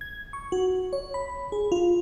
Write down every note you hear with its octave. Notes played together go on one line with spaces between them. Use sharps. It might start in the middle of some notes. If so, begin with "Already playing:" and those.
G#6
C#6
F#4
C#5
B5
G#4
F4